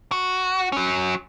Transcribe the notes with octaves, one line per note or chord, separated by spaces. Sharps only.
F#4
F#3 C#4